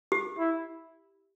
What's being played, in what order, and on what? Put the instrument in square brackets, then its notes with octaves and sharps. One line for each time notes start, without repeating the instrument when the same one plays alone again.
[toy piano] G4
[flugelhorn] E4